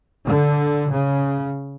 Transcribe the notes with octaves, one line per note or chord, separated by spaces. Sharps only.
D3
C#3